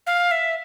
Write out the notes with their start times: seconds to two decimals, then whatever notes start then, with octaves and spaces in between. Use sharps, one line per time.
0.07 F5
0.31 E5